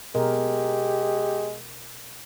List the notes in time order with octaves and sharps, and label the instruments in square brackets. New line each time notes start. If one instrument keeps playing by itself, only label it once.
[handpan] B2 A#4 [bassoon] G#3 [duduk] G4